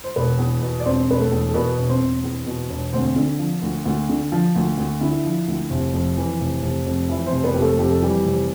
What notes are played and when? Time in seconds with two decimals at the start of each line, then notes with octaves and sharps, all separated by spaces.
0.04 C5
0.16 E1 B3 B4
0.39 E2
0.62 B2
0.80 D5
0.85 E1 C4 C5
1.09 E1 B4
1.20 A3 A4
1.32 E2
1.49 A4
1.54 B2 B3 B4
1.78 E1
1.89 C4 C5
2.01 E1
2.24 E2
2.47 B2
2.70 E1
2.93 D2 C4 C5
3.16 D3
3.39 F3
3.62 D2
3.86 D2
4.09 D3
4.32 F3
4.56 D2
4.78 D2
5.01 D3 E4 E5
5.24 F3
5.48 D2
5.70 F1
5.94 F2
6.17 E3
6.40 F1
6.62 F1
6.86 F2
7.09 E3 E4 E5
7.27 C4 C5
7.32 F1
7.44 B3 B4
7.54 F1 G4
7.61 A3 A4
7.78 F2 G4
7.90 A4
8.02 E3 G3 G4
8.25 F1